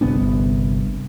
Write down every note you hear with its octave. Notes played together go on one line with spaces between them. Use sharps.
G1 C2 B3 D4